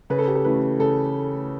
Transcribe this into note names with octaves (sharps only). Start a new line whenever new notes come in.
C#3 B4
A4
G4
A4
E3 A3 C#4 B4
C#3 A4